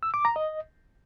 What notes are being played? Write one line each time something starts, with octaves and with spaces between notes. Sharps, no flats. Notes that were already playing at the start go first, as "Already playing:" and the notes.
E6
D6
A#5
D#5